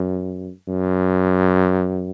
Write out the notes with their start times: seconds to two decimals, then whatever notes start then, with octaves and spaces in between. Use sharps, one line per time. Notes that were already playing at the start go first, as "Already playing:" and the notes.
Already playing: F#2
0.67 F#2